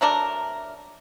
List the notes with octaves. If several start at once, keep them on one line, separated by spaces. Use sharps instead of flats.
F#3 A3 D4 A#4